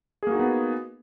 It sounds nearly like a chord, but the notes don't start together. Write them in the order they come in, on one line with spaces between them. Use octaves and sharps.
G#4 A#3 F#4 D#4 B3